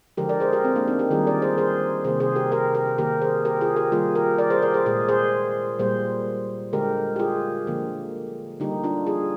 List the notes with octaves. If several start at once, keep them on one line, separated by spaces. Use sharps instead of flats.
D3 F3 G#3 G4 A#4
A#4 D5
G#4 C5
G4 A#4
C4
A#3 D4
C4 D#4
D#4 G4
D#3 G3 A#3 F4 G#4
A#4 D5
G#4 C5
G#4 C5
C3 D#3 A#3 G#4 C5
G#4 C5
G4 A#4
G4 A#4
G4 A#4
D#3 A#3 G4 A#4
G#4 C5
G4 A#4
F4 G#4
G4 A#4
D#3 G3 A#3 F4 G#4
G4 A#4
A#4 D5
G#4 C5
A#4 D5
G#4 C5
A#2 G#3 G#4 C5
G#4 C5
A#2 G3 A#3 G#4 C5
D3 G#3 G4 A#4
G4
F4 G#4
D3 F3 A#3
D3 G3 A#3 D#4 G4
D4 F4
F4 G#4